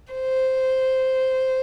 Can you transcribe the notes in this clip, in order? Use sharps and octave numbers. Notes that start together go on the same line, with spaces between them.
C5